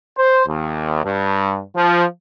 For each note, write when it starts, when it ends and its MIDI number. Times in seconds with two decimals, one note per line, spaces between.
0.16 0.41 72
0.45 1.03 39
1.03 1.60 43
1.75 2.04 53